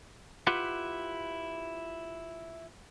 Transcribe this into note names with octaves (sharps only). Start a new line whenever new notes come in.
E4 F4 G4 B4 F#5